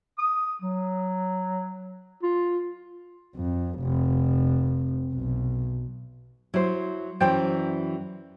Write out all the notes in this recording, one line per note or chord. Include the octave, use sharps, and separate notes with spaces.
D#6
F#3
F4
F2
F1
B1
F#3 E4 C5
F#2 E3 F#3 C5 D5 G5